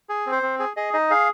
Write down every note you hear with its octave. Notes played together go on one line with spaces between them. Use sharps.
G#4
C4
C5
C4
G#4
G#4 D#5
D#4 D#5
G#4 F5